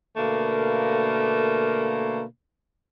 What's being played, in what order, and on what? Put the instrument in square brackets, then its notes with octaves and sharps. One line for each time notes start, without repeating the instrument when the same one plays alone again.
[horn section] B2 D3 A3 A#3